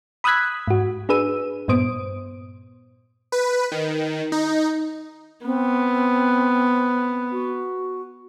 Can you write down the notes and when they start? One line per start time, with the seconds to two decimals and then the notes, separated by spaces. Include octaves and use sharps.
0.24 B5 D#6 E6 F#6 G#6 B6
0.68 G#2 F#4
1.09 D4 G#4 B4 E6 D#7
1.68 G2 A#2 B3 C5 D#6 D7
3.32 B4
3.72 D#3
4.32 D#4
5.46 B3 C4
7.32 F#4